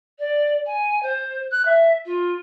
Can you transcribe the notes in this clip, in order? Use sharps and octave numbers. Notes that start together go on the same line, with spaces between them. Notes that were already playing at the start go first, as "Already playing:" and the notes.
D5
G#5
C5
F#6
E5
F4